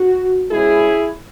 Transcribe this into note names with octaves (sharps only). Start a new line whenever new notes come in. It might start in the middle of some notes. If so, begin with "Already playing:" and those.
Already playing: F#4
B2 G#3 C#4 E4 G#4